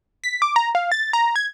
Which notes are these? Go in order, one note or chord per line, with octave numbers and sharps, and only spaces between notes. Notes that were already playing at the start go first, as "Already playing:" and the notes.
B6
D6
A#5
F5
A6
A#5
G#6